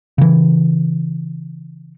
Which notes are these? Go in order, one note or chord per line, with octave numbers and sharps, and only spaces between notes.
C#3 E3